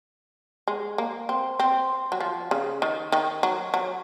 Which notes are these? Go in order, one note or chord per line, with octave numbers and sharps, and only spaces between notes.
G#3
A#3
C4
C4
F#3
F3
C#3
D#3
D#3
F#3
F#3